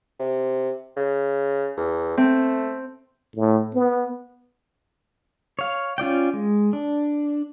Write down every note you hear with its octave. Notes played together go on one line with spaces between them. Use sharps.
C3
C#3
E2
A3 C4
A2
B3
C#5 F5
C#4 F4 D5 G5
G#3
D4